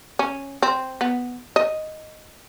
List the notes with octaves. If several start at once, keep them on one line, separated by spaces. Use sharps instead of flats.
C#4
C4
B3
D#5